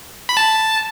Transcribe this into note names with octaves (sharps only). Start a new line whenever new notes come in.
B5
A5